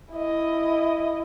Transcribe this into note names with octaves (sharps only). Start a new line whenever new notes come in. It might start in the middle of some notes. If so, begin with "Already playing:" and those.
E4 D#5